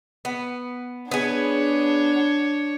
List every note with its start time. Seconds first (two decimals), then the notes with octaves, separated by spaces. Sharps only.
0.25 B3
1.11 B3 D4 G#4 C#5